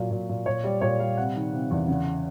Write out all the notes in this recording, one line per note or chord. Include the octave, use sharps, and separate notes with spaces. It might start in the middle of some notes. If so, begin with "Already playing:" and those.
Already playing: A#2 F#3
A#2
A#2
A#2 C#5
G3 D5
A#2 C#5
G3 F5
C3 F#5
D#3
C3
E2
C#3